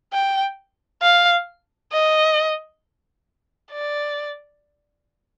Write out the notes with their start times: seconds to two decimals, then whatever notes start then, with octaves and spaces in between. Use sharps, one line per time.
0.13 G5
1.02 F5
1.92 D#5
3.72 D5